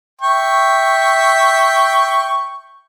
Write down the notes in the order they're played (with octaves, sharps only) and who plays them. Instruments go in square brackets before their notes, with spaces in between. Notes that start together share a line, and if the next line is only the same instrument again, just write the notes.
[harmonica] E5 G5 C#6